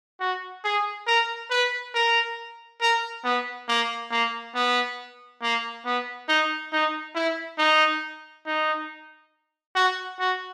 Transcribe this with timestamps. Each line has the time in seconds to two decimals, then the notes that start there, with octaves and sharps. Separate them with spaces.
0.20 F#4
0.65 G#4
1.07 A#4
1.50 B4
1.94 A#4
2.81 A#4
3.24 B3
3.68 A#3
4.11 A#3
4.55 B3
5.42 A#3
5.85 B3
6.29 D#4
6.72 D#4
7.15 E4
7.58 D#4
8.46 D#4
9.75 F#4
10.19 F#4